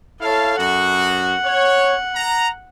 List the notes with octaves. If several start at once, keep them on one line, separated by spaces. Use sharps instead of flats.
E4 A4 C#5 F5 A5
F#2 F#4 F#5
C#5
A#5